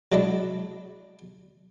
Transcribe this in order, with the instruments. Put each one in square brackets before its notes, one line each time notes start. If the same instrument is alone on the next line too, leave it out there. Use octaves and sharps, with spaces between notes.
[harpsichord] F#3 G#3 D4 E4